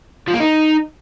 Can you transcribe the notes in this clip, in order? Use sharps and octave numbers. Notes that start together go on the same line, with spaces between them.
F3
A#3
D#4